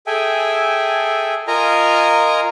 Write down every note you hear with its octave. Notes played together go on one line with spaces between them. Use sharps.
G#4 A4 E5 G5 G#5
F4 A#4 D#5 G#5 A#5